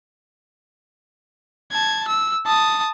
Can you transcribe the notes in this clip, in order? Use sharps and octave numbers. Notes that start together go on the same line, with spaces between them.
A5 G#6
E6
A5 D#6